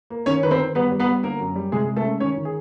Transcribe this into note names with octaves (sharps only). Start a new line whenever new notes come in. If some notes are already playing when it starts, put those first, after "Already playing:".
A#3
D#3 C#4 C#5
D#3 B4
C4 C5
D#3
G3 B3 B4
G3
B3 B4
G3
D3 A#3 A#4
F#2
G3
C3 G#3 G#4
G#3
A3 A4
C#4
D#3 C#4 C#5
D#3
G#4